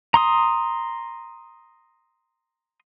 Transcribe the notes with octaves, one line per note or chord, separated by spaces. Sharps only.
A#5 C6 D#6